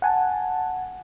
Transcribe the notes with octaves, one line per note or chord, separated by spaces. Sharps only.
F#5 G#5 A5